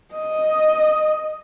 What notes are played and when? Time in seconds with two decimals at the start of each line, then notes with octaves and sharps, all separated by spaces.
0.15 D#5